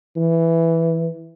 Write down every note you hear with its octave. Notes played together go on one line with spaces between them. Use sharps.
E3